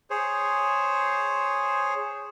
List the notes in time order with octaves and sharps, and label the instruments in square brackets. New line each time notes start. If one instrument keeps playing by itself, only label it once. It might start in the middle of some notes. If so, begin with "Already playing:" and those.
[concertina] G#4 C5 C#5